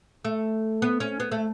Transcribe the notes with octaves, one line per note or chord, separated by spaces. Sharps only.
A3
B3
C#4
B3
A3